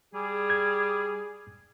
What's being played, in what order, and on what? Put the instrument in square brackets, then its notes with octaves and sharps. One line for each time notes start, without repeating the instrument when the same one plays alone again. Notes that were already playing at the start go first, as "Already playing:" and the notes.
[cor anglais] G3 [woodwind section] G#4
[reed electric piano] G#6